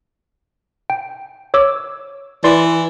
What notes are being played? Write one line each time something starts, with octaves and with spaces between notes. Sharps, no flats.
G5
C#5 D6 E6
E3 D5 C6